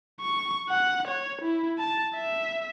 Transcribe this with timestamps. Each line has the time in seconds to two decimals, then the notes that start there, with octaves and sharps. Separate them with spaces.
0.21 C#6
0.69 F#5
1.08 C#5
1.42 E4
1.79 A5
2.15 E5